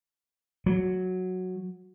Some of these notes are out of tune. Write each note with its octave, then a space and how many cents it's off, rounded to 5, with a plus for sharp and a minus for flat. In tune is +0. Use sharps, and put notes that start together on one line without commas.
F#3 -5